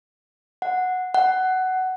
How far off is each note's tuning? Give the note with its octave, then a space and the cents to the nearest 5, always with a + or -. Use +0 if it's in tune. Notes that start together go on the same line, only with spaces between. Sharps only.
F#5 -5
F#5 +15